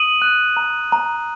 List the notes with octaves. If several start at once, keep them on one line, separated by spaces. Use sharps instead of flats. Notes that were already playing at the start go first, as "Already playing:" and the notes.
Already playing: D#6 D#7 F#7
F#6
A#5
A#5